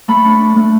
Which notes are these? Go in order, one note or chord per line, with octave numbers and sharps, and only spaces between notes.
A3 B5
D4
D4
A3